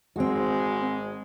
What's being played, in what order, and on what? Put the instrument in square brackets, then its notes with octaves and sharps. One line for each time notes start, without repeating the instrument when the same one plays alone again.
[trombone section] G#1 G#2 G#3 [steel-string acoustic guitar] C4 F#4